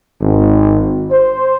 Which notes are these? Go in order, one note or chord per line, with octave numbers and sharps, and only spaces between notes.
G#1
C5